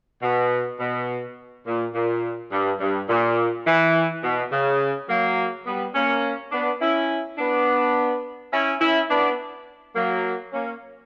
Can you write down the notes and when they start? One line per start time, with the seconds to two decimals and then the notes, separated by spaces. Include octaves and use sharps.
0.22 B2
0.80 B2
1.67 A#2
1.94 A#2
2.52 G2
2.80 G2
3.09 A#2
3.66 E3
4.24 B2
4.52 C#3
5.09 F#3 A#3
5.66 G3 B3
5.95 A#3 C#4
6.52 B3 D4
6.81 C#4 E4
7.38 B3 D4
8.52 C#4 E4
8.81 C#4 E4
9.10 B3 D4
9.95 F#3 A#3
10.53 A#3 C#4